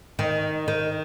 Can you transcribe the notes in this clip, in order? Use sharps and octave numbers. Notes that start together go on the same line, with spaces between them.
D#3
D#3